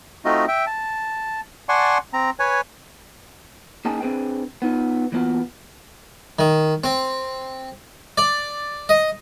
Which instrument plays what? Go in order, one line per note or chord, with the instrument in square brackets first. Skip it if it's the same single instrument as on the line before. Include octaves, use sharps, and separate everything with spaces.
[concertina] A3 C4 D#4 F4 F#4 D#5
E5 G5
A5
D5 F#5 G#5 A5 C6 C#6
C4 A#5
B4 C#5 G#5
[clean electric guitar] A#3 C#4 D#4 G#4 G5 A5
C4 D4 G#4 B4 C5 G5
B3 D#4 F4
E3 A#3 B3 F4 F#4
[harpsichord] D#3
C4
D5
D#5